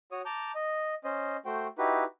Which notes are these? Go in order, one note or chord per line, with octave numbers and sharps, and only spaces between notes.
F#4 C#5 D#6
A5 A#5 D6 G6
D#5
C#4 C5 D#5
A3 F#4 C5 G5
D#4 E4 F#4 G4 B4